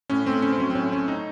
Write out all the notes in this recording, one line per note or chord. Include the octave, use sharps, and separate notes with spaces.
A2 C#4
A3 C4
C4 C#4
C4
F#3 C#4
C4
A2 C#4
A3 C#4
D#4